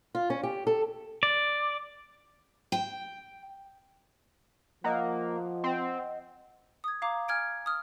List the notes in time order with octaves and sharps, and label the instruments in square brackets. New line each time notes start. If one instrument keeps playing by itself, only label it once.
[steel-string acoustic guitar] F4
C#4
G4
A4
[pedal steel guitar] D5
[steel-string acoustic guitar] G5
[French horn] F3 [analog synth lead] A#3 [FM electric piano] D#5 F#5
[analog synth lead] C4
[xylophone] D#6 G#6
F5 A#5 D6
G#5 F6 G#6 D7
D#6 F6